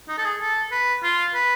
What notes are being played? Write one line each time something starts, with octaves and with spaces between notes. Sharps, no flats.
D#4
A4
G#4
A4
B4
F4
B4